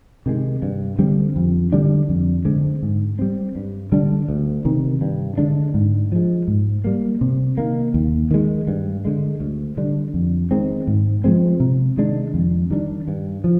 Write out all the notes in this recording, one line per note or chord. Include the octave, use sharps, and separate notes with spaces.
C3 D#3 G#3
G2
D3 G3 C4
F2
D3 G3 D4
F2
D3 G#3 C4
G#2
G3 C4
G2
D3 G3 D4
D2
C3 D#3
G2
D3 G#3 D4
G#2
F3 G#3
G#2
G3 A#3
C3
D#3 A#3
D#2
D#3 G#3
G2
D3 G#3
D2
D3 G3 D4
F2
D#3 G#3 C4
G#2
F3 G#3 C4
C3
D#3 G#3 D4
F2
D#3 G3 D4
G2
F3